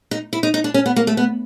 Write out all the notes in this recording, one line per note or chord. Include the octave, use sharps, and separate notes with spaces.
D#4
E4
D#4
D#4
D4
C#4
B3
A#3
A3
B3